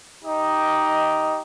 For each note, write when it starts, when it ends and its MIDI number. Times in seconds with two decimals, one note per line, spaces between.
0.24 1.41 63
0.24 1.41 67
0.24 1.41 75